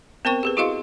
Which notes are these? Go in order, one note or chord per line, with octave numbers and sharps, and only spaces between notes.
B3 C4 A#4 C5 G5 C#6
G4 G#4 B4
E4 F#4 G#4 D#5 F5 C6